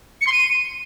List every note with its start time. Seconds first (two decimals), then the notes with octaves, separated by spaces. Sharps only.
0.21 C#7
0.27 C6
0.32 D#7